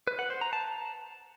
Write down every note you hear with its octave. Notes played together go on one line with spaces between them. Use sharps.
B4
F#5
C5
A#5
A5